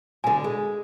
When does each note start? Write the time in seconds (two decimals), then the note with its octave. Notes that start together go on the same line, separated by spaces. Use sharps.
0.24 B2 D3 G#5
0.44 G#3